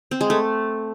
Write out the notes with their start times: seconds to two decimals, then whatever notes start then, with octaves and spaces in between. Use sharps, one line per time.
0.11 C4
0.21 G#3
0.30 A3